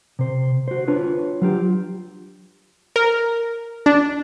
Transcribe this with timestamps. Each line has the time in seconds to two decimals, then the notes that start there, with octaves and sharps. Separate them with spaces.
0.19 C3 C5
0.68 F#4 C5
0.87 D4 F4 B4 C#5
1.42 F#3 F4 G4
2.96 A#4
3.86 D4